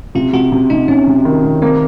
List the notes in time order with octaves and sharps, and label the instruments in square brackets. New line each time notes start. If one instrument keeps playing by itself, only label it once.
[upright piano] C3 [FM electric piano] F4
[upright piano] C3 [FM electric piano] F#4
[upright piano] C3
[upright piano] C3 [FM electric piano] D#4
[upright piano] C3 [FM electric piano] C#4
[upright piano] C3
D#3
C3
[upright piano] A#3 [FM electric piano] C4